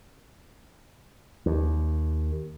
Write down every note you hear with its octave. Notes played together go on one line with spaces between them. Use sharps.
D#2